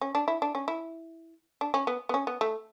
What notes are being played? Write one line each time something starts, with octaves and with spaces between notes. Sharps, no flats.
C#4
D4
E4
D4
C#4
E4
D4
C#4
B3
B3
C#4
B3
A3